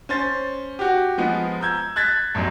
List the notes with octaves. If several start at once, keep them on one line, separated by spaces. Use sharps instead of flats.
C#4 C5 A6
F#4 G4
F3 G#3 B3
A#5 E6 G6 G#6
F#6 G#6 A6 B6
F1 B1 F#2